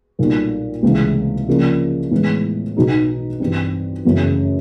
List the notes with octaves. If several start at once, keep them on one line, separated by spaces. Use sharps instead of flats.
B1 A#2 G3 A#3
C#2 C3 E3 A3 C4
C#3 F3 A#3 D4
A2 E3 G#3 B3
B1 B2 F#3 B3 D#4
G2 E3 G3 C4
F#2 C#3 E3 A3